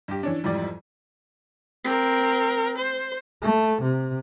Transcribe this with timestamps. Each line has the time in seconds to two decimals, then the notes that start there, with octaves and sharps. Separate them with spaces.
0.08 G2 G4
0.23 E3 C#4 D4
0.44 F2 G#2 E3 G3 D5
1.84 C4 A#4
2.78 C5
3.42 A3
3.82 C3